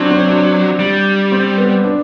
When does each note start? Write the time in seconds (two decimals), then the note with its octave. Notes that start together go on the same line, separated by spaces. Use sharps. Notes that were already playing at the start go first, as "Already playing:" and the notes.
Already playing: F#3 C4 D4
0.11 C4
0.28 D4
0.80 G3
1.32 C4
1.58 B3
1.84 D4